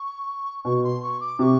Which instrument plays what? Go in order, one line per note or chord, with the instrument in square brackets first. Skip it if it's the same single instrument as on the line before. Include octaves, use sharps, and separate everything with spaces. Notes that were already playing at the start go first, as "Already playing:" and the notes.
Already playing: [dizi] C#6
[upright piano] B2 [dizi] C#6
[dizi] C6
C#6
D6
[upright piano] C3 [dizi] D6
[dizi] C#6